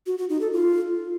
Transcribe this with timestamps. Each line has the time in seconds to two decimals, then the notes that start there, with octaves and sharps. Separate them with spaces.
0.07 F#4
0.18 F#4
0.30 D#4
0.41 A4
0.53 F4